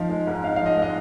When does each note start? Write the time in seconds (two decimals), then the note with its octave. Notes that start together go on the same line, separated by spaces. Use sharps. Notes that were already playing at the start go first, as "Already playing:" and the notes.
Already playing: F3 D#4 F5
0.09 G#3
0.27 G#2
0.44 D#4 F5
0.56 F5
0.61 F3 D#5
0.77 G#3
0.82 D#5